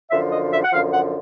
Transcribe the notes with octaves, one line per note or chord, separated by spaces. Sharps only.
F#2 D3 F3 E5
D#5
E5
F#5
F#2 D3 F3 F5
F#5